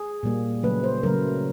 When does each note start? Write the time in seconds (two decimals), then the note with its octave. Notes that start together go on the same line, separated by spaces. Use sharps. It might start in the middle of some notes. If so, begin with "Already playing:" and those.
Already playing: G#4
0.23 A#2 G3 A#3
0.63 C#3 F#3 A3 B4
0.84 C5
1.03 C#3 F#3 A3 A#4